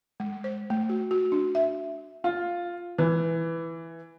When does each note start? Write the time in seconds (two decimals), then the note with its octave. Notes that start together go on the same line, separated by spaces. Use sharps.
0.20 G#3
0.44 C5
0.70 A3
0.89 F#4
1.11 F#4
1.32 D4
1.55 E5
2.24 F4
2.98 E3